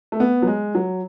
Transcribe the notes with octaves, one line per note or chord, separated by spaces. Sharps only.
A3
B3
F#3
G#3
F#3